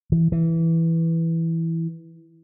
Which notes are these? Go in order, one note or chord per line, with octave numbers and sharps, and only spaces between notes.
E3
E3